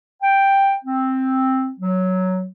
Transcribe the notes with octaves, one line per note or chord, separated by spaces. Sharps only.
G5
C4
F#3